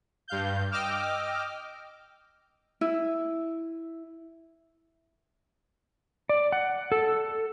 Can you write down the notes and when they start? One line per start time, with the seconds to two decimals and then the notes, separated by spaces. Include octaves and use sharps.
0.28 G2 F5 G6
0.71 D#5 G5 D6 E6 F6
2.81 E4
6.29 D5
6.52 F#5
6.92 A4